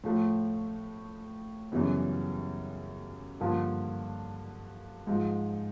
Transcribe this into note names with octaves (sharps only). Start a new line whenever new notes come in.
A2 F3 A3
F#2 C#3 E3 G3 B3
G2 D3 F3 A#3
G#2 F3 G#3